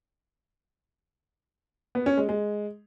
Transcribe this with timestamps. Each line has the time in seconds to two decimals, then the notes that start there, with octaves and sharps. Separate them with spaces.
1.95 B3
2.06 C#4
2.17 G#3
2.29 G#3